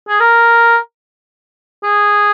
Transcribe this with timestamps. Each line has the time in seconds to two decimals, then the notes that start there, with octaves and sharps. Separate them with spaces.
0.08 G#4
0.20 A#4
1.83 G#4